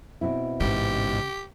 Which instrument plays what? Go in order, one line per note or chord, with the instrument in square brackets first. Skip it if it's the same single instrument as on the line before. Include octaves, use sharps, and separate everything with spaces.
[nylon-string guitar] B2 C4 E4
[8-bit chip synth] A1 G#2 [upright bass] C#3 [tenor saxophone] G4